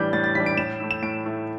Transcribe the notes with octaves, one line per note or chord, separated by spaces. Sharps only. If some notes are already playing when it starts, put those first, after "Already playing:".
Already playing: A2 E3 G3 D4 G6
A2 A6
A6
E3 G3 D4 B6
D7
A2 E7
A3 E4
E7
A2 D7
A3 E4